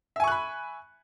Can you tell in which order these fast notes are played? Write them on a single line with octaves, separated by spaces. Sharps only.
E5 G#5 C#6 F#6 B5